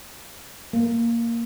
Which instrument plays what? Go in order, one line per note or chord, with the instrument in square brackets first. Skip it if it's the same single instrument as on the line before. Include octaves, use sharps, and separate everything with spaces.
[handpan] A#3